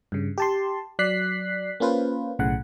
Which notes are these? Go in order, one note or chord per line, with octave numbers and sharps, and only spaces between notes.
G2 C#3
G4 A5 C6
F#3 D5 F#6 B6 C7
A#3 C#4 F4 B4 C5
B1 A2 C#3 F#5